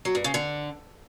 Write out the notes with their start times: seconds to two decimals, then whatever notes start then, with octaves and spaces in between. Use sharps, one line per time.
0.05 F#3
0.15 G2
0.24 C#3
0.34 D3